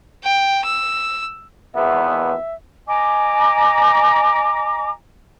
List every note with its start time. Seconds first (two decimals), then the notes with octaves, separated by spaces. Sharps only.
0.24 G5
0.65 E6
1.74 G#1 E2 B3 E5
2.88 D#5 G#5 A#5 D6